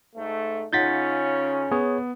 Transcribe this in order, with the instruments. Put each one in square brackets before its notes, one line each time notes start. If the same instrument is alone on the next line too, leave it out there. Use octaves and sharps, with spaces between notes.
[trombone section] G#2 A3
[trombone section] C#3 C#4 [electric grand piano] D#4 F4 F#5 [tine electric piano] G6 A6 B6
[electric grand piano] B3 [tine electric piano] G#4 C#5